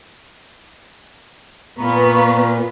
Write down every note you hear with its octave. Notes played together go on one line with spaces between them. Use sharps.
A#2 B3 F4 B4 A#5 C#6